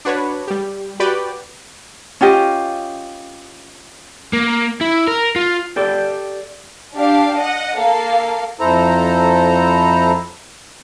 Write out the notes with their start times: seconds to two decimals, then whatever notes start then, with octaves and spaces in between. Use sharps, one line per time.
0.05 D4 F#4 B4 C#5
0.47 G3 G4
1.00 F#4 G4 B4 D5 G5
2.21 C#4 F4 G4 D#5
4.33 A#3
4.81 E4
5.08 A#4
5.36 F4
5.76 G4 A4 D5 G5
6.97 D4 G4 F5
7.38 D#5 F#5
7.78 A#3 A4 F5
8.60 F2 E4 A4 C5 A#5